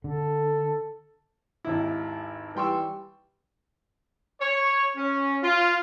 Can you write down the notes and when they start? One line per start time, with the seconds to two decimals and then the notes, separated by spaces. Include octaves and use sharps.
0.04 D3 A4
1.65 G#1 D#2 E4
2.55 E3 G3 G5 C6 C#6 E6
4.40 C#5
4.95 C#4
5.42 F4